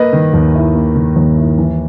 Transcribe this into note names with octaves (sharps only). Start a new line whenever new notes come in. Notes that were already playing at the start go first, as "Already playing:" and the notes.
Already playing: A#3 B4 D#5
D#3
D#2
E4
A#3
D#3
D#2
E4
E3